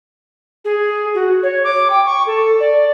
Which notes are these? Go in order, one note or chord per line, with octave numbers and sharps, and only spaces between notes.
G#4
F#4
C#5
D6
G5
C#6
A4
D5